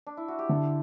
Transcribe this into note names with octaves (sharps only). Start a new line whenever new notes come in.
D4
E4
F#4
G4
D3 A4